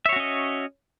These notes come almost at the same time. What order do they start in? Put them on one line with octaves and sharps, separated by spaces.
E5 C#5 F#4 C#4 D#5